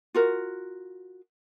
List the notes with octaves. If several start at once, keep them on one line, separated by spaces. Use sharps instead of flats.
F4 F#4 A#4